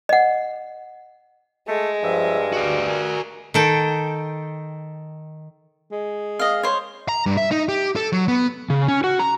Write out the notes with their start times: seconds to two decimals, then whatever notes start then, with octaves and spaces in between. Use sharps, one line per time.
0.09 D#5 F#5
1.68 G#3 A3
2.03 G2 F3 E5
2.53 D2 F#4 D5
2.87 A#4 G#5
3.54 D#3 A4 G5
5.92 G#3
6.39 D#5 F5
6.63 C5 C#5
7.09 A#5
7.26 G2
7.37 E5
7.51 D#4
7.69 G4
7.96 A4
8.12 F#3
8.28 B3
8.70 C#3
8.88 C#4
9.04 F#4
9.19 A#5